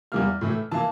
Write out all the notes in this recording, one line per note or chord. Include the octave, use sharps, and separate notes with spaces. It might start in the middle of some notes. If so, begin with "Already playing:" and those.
E2 E3 G3 A#3 F6
A2 E3 A3 E4
E3 A#3 A5